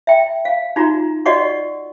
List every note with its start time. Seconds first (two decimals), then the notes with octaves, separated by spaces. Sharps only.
0.07 E5 G5
0.45 F5
0.76 D#4 F4 F#4 A#5
1.26 F#4 D5 D#5 F#5 C#6